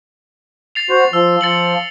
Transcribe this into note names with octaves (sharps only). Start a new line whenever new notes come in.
A6 C7 F7
F#4 C5
F3 E6
F3 A6 C#7 F#7